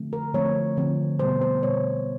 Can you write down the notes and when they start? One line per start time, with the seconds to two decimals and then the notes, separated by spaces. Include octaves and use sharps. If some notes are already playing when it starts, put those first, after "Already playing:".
Already playing: D3 F3 A3 C4
0.13 A#4
0.33 D3 F3 A3 C4 C#5
0.77 D3 F3 A3 C4
1.19 B2 G3 B3 C5
1.41 C5
1.62 B2 G3 B3 C#5